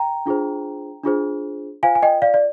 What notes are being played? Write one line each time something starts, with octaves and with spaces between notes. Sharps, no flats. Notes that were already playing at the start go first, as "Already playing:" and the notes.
Already playing: G5 A#5
D4 F4 G#4 C5
D4 F4 G#4 C5
F4 C5 F5 G#5
G#5
D#5 G5
D5 F5
D5